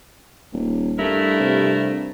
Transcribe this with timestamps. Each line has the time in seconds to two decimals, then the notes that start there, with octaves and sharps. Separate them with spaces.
0.53 D#1
0.98 G2 A3 E4 A#4
1.40 C3